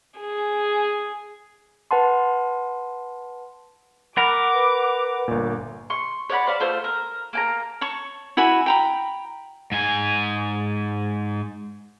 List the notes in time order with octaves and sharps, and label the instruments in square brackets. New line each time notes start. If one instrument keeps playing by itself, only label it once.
[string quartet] G#4
[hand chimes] B4 F#5 A5 C6
[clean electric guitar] A#4 [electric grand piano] F#5 B5 [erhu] D6
[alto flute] B4
[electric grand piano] G1 A#2
[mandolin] C6 C#6
C#5 D5 F#5 B5
C5 D5 F5 B5
A3 F4 C5
A#4
A#3 G#5 A#5
[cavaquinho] C#5 A5 C#6
E4 F#4 G#5 B5
G5 A#5 B5
[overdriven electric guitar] G#2 G#5